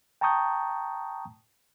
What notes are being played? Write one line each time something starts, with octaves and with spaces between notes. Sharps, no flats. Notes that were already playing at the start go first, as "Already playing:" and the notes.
G5 A5 A#5 C#6 D#6 G6